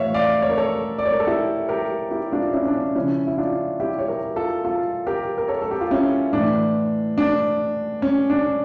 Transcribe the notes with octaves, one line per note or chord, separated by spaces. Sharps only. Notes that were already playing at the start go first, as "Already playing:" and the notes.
Already playing: A2 E3 C#5 E5 F5
D5 F5
C#5
A#4
A4 C#5
D5
C#5
A#4
A4
E4 G4
G4 A#4
E4 G4
D4 F4
C#4 E4
D4
C#4
C#3 F3 C#4 E4
E4
D4 F4
E4 G4
C#5
G4 A#4
F4 A4
F4 A4
G4 A#4
A#4
A4 C#5
A4
G4
F4
C#4 E4
A2 E3 D4
D4
C#4
D4